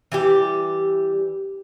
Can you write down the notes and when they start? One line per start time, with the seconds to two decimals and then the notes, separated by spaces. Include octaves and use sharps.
0.12 E3 G3 G4